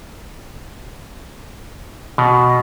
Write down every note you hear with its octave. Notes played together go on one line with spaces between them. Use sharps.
B2